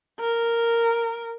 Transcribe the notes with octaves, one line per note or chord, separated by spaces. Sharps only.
A#4